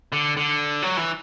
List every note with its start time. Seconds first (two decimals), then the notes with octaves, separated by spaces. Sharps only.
0.12 D3
0.37 D3
0.82 F#3
0.97 E3